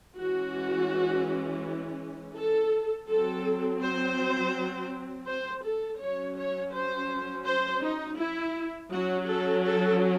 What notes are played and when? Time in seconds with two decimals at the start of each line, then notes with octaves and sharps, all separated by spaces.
0.16 E3 G#3 C#4 F#4
2.36 A4
3.08 F#3 C4 A4
3.81 C5
5.27 C5
5.64 A4
6.00 F#3 C#4 C#5
6.37 C#5
6.73 C5
7.46 C5
7.83 D#4
8.19 E4
8.92 F#3 C#4 F#4
9.28 A4
9.65 A4